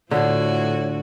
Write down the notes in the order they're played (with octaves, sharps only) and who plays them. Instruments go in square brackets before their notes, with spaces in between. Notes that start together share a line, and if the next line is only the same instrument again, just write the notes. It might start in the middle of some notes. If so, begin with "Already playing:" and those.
[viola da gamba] A2 F3 F#4 [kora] D3 [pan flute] C#5